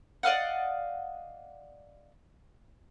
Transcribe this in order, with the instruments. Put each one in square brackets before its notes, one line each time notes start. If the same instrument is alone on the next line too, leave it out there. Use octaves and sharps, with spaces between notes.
[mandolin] D5 D#5 F5 F#5